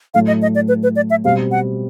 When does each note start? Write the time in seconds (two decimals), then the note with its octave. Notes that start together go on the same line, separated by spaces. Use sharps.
0.14 A2 F#3 A3 F5
0.27 D#5
0.42 D#5
0.55 D5
0.68 B4
0.83 B4
0.96 D5
1.10 E5
1.24 B2 G3 C4 F5
1.51 F#5